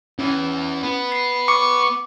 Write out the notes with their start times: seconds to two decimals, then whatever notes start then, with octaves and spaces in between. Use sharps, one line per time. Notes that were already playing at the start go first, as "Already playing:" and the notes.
0.19 E2 E3 C#4
0.83 B3
1.12 C7
1.48 C#6 D6